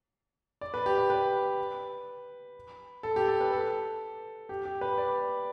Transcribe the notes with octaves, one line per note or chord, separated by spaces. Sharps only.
D5
B4
G4
G4
B4
A4
G4
A4
B4
A4
G4
G4
B4
D5